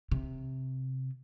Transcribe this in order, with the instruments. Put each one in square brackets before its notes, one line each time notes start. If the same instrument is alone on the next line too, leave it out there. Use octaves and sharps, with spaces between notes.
[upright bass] C3